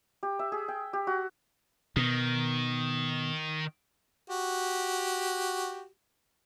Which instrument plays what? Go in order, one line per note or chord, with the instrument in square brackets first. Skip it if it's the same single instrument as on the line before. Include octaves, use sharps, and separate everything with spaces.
[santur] G4
E5
G#4
G5
G4
F#4
[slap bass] B2 [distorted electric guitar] D#3
[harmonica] F#4 G4